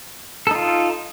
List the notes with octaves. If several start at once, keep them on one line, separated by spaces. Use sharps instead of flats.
D#4 F4 A4